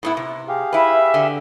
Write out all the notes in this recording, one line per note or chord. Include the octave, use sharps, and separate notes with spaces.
A2 B3 E4
C3
G4 G#4 F5
E4 B4 E5
D3